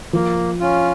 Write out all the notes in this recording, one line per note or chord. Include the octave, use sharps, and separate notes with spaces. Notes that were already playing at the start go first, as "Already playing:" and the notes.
F3 A#3
C#4 F4